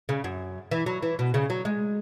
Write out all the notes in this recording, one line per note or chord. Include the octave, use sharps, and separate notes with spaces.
C#3
F#2
E3
F#3
E3
B2
C#3
F#3
G#3